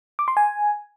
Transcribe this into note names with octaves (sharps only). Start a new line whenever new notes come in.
D6
C6
G#5